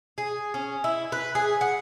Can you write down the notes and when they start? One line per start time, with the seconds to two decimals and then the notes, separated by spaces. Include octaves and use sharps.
0.18 G#4
0.54 C#4
0.84 E4
1.12 B4
1.35 G#4
1.61 F#5